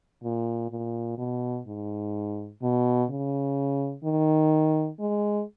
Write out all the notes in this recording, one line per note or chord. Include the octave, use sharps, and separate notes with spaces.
A#2
A#2
B2
G#2
B2
C#3
D#3
G#3